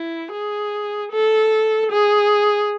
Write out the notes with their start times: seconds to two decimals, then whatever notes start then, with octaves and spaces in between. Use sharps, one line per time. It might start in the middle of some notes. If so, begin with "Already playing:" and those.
Already playing: E4
0.32 G#4
1.12 A4
1.91 G#4